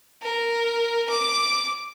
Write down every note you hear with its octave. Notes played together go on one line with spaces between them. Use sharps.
A#4
D6